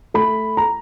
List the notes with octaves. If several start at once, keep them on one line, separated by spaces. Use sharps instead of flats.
A3 B5
A#5